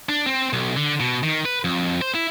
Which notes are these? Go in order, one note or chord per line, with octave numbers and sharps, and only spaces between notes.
D4
C4
B1
D3
B2
D#3
B4
F2
C5
E4